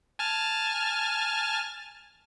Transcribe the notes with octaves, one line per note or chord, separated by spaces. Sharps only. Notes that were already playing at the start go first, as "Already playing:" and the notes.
G#5 A5 F6